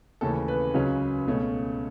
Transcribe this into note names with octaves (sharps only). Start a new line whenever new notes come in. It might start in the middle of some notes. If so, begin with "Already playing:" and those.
D#2 C#3 E3 A3 C#4 A4
B4
C#2 C#3 F#3 C#4
C#2 B2 A3 C#4